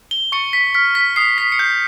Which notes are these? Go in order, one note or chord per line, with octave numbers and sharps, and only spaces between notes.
G7
C#6 C#7
B6
F6 B6
B6
D#6 C7
B6
C#7
G6 C7